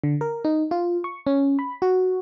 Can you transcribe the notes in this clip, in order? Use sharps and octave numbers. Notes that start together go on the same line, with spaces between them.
D3
A#4
D#4
F4
C#6
C#4
B5
F#4